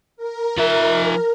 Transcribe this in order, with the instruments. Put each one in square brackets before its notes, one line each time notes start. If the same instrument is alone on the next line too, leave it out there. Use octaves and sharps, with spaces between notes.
[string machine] A#4
[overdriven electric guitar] F3 E5